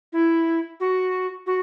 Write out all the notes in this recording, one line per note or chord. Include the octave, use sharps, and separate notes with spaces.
E4
F#4
F#4